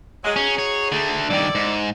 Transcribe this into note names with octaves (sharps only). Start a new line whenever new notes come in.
F#3 G#3
C#4 D#4 F#4 G#4
C#5
D3 A3
G2 D#3 E4 A4 D5
G#2